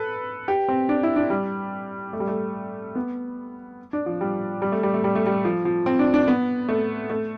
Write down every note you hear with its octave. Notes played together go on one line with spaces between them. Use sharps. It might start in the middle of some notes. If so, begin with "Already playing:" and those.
Already playing: A4 B4
G4
C4
D4
E4
D4
G3
A3
G3
A3
B3
D4
F3
G3
G3
A3
G3
A3
G3
A3
G3
F3
F3
C4
D4
D4
B3
A3
A3